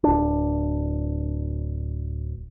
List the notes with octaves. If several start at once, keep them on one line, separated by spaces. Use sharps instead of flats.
D1 D4